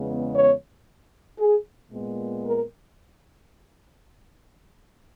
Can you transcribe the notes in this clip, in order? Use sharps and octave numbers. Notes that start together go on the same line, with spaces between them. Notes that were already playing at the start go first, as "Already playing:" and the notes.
Already playing: E2 C#3 G#3 B3
C#5
G#4
A#2 G#3 B3
A#4